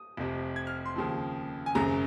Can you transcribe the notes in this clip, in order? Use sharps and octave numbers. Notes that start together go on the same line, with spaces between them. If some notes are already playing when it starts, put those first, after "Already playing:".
Already playing: D#6
F1 F2 C3
G#6
F6
C6
D#2 C#3 F3
G#5
G#1 F#2 C#3 A#5